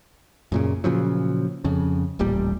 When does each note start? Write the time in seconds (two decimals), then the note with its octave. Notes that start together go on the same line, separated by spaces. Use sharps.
0.52 F#2 A#2 C#3
0.84 A#2 C#3 F3 F#3
1.64 F2 C#3
2.19 D#1 A1 A#2 G3